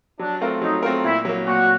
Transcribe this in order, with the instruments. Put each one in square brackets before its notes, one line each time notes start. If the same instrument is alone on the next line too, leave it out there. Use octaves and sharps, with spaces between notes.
[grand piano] F#3 [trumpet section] D4
[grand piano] A3 C4 F4 A#4
[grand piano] F#3 [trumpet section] D#4
[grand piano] A3 C4 F4 A#4
[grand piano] A#2 [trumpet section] E4
[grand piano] F#3 A#3
[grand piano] A#2 [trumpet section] F#4